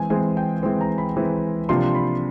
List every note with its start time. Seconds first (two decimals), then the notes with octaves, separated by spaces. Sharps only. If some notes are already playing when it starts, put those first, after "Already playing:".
Already playing: E3 G#3 C4 G#5
0.10 E3 G#3 C4 G#5
0.37 G5
0.63 E3 G#3 C4
0.81 A#5
0.98 B5
1.17 E3 G#3 C4
1.69 C3 F3 A#3 D4 F4 C6
1.95 B5